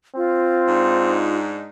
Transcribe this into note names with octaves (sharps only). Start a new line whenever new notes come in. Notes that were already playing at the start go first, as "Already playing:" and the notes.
C4 F4
G#2 D4 D#4